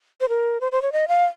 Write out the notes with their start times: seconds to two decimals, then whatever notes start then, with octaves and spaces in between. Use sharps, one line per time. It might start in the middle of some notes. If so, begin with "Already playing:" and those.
0.21 C5
0.29 A#4
0.61 C5
0.72 C5
0.82 C#5
0.92 D#5
1.08 F5